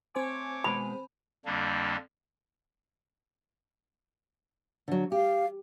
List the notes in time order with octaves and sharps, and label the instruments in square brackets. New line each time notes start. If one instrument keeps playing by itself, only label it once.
[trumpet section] A3 C#5 D6 [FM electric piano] C4 C5 G#5
[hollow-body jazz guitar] B2 G#3 B4 [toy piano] B5
[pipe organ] F2 D3 G3 A#3 D4
[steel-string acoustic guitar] D3 F#3
[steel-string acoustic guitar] G4 [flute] F5